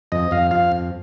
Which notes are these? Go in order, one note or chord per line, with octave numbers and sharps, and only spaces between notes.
F2 D#5
F2 F5
F3 F5
F2